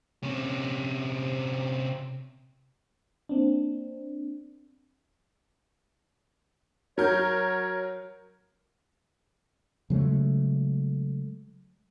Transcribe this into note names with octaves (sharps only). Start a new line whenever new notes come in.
C3 C#4
A#3 C4 D4
F#3 A#4 C#5 G6
C#3 F#3 G#3 A3